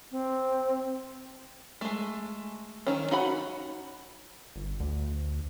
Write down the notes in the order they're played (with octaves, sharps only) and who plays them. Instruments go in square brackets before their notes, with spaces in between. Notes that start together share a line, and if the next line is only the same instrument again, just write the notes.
[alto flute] C4
[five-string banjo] G#3 A3
D#3 C#4
D#4 F#4 F#5 B5
[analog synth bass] G1
D2